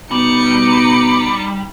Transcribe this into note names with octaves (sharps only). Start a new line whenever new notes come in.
B2 G3 D#4 D6 C#7